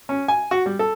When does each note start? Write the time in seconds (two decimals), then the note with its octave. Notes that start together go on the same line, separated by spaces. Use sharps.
0.09 C#4
0.28 G#5
0.51 F#4
0.66 G3
0.79 A4